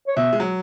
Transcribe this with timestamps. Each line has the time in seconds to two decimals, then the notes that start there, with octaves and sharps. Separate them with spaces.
0.07 C#5
0.17 B2 E5
0.33 G#3
0.40 F#3